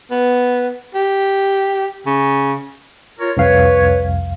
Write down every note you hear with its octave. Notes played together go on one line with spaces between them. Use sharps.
B3
G4
C#3
F4 A#4 C#5
C2 F2 B4 C#5 F5